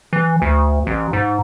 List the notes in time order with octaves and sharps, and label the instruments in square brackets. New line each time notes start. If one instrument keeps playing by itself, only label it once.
[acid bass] E3
D2
A1
G#2